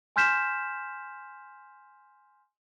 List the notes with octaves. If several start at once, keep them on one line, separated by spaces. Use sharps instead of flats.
G#5 C6 F6 G6 B6 E7